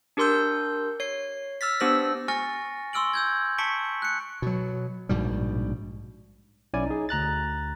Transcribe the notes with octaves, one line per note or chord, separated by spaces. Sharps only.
D4 G4 A#4 C6 E6 G6
C#5 C7
E6 F6 A6 B6
B3 D4 G4 C5 E6 A#6
G#5 C#6 F6 A6 A#6 C#7
C6 C#6 E6 F6 D7 F#7
E6 G6 G#6
A5 C#6 B6 C#7 D7 F#7
F#6 C#7
B2 F#3
A#1 G#2 B2 G3
B1 C#4 E4 D5 G#5
D#4 G#4
D2 A#5 F#6 A6